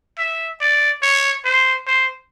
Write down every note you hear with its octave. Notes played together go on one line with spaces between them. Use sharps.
E5
D5
C#5
C5
C5